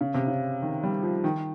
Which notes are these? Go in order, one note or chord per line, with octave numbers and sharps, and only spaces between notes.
C#3
C3
C#3
D#3
G3
F3
D#3